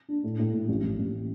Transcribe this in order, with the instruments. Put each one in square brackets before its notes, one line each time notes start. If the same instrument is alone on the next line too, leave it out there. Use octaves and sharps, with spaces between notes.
[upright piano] D4
A2
A2
A2
A1
A1
A1